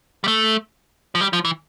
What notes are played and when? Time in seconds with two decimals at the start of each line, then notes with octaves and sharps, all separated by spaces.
0.24 G3
0.28 A3
1.15 F3
1.21 G3
1.33 F3
1.45 E3